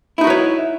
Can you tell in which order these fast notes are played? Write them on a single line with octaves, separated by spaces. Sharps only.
E4 D#4 F#4 B4 C#5